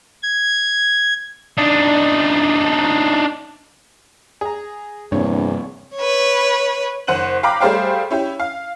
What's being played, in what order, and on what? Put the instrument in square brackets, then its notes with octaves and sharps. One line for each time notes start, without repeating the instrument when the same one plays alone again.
[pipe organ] G#6
[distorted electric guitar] D4 D#4
[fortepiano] G#4 A#5
[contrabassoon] A#1 [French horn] E2 [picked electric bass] G2 C3 [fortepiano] C#5
[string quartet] B4 C#5
[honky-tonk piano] F#1 C5 F#5 F#6 D#7 F#7
F5 G5 A#5 B5 D6
G3 A3 G#4 C5 F5 G5
C#4 E4 G4
F5